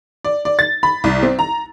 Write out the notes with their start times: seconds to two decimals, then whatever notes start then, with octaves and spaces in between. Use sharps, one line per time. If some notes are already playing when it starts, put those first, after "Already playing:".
0.25 D5
0.45 D5
0.59 A6
0.83 B5
1.04 C2
1.23 C4
1.39 A#5